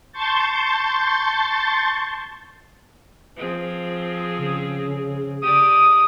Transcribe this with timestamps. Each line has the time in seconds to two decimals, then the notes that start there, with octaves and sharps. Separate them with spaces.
0.12 A5 C6 C#6 G6 A6
3.36 F3 C4 G#4
4.38 C#3
5.42 G4 D5 D#6